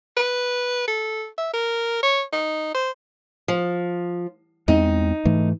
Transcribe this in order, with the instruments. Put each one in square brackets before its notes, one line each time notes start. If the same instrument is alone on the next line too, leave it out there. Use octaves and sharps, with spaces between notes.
[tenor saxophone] B4
A4
E5
A#4
C#5
D#4
C5
[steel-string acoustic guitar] F3
[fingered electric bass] E2 G#3 C4 [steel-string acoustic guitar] D#4
[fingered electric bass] G#2 E3 A3